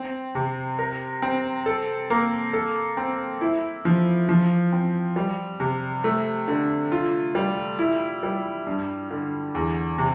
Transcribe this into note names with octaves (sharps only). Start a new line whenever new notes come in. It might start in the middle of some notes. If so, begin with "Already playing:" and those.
Already playing: C4
C3
A#4
C4
A4
A#3
A4
C4
E4
F3
F3
C4
G3
C3
A3
D3
F4
G3
E4
G3
G2
D3
E2
C3